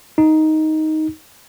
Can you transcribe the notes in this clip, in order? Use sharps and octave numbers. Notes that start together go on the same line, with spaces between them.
D#4